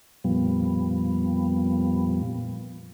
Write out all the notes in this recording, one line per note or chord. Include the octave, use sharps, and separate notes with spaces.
F2 A#2 F3 G3 B3